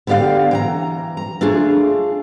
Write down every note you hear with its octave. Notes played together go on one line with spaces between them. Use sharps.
D3 B3 G4 D5 F5
E3 G5 A#5
A#5
A3 D4 F4 G#4